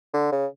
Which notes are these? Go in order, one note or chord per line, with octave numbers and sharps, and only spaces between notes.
D3
C#3